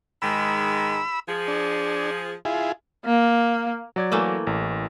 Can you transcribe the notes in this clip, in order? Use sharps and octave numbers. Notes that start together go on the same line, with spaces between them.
G#2 D#3 G#3 B5 E6
F3 G#4
D4
E4 F4 G#4
A#3
F#3 D5 G#6
E3 A3 A#3
A1